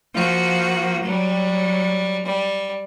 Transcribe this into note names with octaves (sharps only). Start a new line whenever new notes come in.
F3 A#3 F#4
F#3 G3
G3